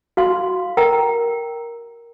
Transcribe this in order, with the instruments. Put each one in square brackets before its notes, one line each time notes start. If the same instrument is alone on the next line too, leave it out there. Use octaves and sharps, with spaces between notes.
[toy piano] F#4 F5 C6
A#4 G5 A#5